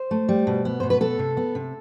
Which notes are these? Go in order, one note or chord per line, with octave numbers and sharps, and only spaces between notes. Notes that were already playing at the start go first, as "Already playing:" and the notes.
Already playing: C5
A3
G3
B2
B3
B2 C5
B4
B3 A4
C3
B3
C3